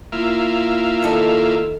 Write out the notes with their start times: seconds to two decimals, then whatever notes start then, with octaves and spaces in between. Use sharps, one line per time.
0.12 A#3 E4 F4
1.03 D#3 A4 D#5